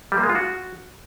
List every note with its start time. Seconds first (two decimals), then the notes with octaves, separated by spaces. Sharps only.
0.12 G3
0.18 A#3
0.24 G#3
0.29 F4
0.35 F#4